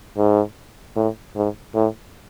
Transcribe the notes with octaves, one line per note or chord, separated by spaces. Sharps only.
G#2
A2
G#2
A2